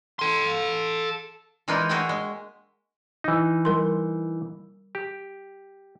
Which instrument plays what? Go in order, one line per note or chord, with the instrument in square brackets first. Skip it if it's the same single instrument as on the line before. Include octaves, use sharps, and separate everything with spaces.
[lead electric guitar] A4 C6
[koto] E3 G#3 A#3 D4 D#4 F4
F#4 G#4 A#4 E5 F5 G5
G#3
[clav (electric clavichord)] E3 D#4
[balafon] G3 A#4 C6
[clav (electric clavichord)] G4